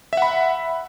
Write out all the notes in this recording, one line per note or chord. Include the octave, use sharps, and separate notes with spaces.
E5 F#5 B5